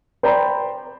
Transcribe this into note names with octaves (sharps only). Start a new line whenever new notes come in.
C5 D5 G5 A#5 B5